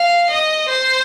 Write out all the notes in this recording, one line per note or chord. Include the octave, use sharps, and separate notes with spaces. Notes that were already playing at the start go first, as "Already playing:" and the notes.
Already playing: F5
D#5
C5